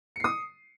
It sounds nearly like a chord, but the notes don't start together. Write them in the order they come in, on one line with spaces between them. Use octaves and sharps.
C#7 C7 D#6